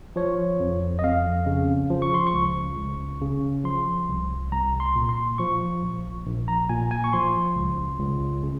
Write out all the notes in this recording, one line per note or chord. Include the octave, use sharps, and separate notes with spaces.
F3 C#5
F2
D#5
F2 F5
C#3
F3
C#6
C6
C#6
C#2
C#2
C#3
F3 C6
C2
C2 A#5
C6
A#2
C6
F3 C#6
A#1
A#1
A#5
A#2 G#5
G#5
C#6
F3 C6
C#2
C#2
C#3